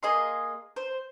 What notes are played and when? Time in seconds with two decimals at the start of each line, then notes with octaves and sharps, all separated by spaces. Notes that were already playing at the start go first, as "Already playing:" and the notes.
0.03 A#3 G#4 D#5 C6
0.76 C5